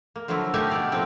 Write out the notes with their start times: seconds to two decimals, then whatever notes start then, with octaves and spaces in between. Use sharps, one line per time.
0.16 A#3
0.28 D3 F3 F#3 A#3 E4
0.54 A3 A#3 D#4 G4 E5 G#5
0.70 B2 E4 D5 F5
0.92 A2 F3 C4 D#4 G5